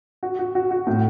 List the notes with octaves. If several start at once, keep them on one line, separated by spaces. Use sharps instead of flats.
F#4
F#4
F#4
F#4
A2